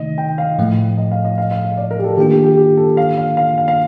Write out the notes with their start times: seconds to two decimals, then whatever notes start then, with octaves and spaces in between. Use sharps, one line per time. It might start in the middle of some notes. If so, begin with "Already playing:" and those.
Already playing: C3 D#3 A3 D#4 D#5
0.18 G5
0.38 F5
0.59 A2 F3 A3
0.98 D#5
1.12 F5
1.25 D#5
1.38 F5
1.51 F5
1.65 D#5
1.77 D5
1.91 A#4
1.99 G4
2.04 A4
2.17 D#3 A#3 D4 F4 G4
2.31 G4
2.44 G4
2.57 G4
2.77 A4
2.97 F5
3.17 F5
3.37 F5
3.58 F5
3.68 F5